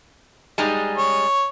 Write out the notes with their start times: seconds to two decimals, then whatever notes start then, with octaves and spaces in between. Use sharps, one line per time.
0.58 G3 G#3 D#4
0.98 C#5